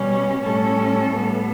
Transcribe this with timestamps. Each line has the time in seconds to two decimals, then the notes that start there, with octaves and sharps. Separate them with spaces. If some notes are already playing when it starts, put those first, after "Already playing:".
Already playing: B2 G3 C#4
0.43 A2 G3 C#4 A4
1.12 A2 G3 B3